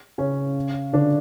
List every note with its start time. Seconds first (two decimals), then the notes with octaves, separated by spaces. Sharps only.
0.18 C#3 C#4
0.93 D3 D4